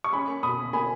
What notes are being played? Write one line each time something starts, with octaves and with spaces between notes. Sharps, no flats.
C#6
C#4 G#5 B5
A#3
B2 B5 D#6
A#3
A#3 G#5 B5